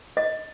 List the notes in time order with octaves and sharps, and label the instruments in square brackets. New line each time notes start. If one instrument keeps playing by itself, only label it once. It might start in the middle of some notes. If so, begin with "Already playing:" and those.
[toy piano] D#5